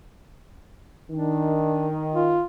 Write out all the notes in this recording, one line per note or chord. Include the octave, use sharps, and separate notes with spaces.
D#3 D4
F4